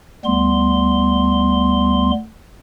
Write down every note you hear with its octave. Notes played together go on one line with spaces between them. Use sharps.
D2 G3 B3 C6